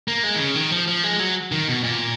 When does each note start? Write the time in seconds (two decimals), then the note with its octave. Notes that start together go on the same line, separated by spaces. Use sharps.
0.08 A#3
0.23 G#3
0.35 D#3
0.40 C#3
0.55 D#3
0.72 F3
0.88 F3
1.04 G#3
1.20 F#3
1.52 D#3
1.68 B2
1.83 A#2